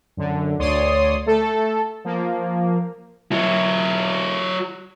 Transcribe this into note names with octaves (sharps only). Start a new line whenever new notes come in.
F#2 D3
D2 C#5 D5 C6 D#6
A3 A4
F3 A#3
F#3 E4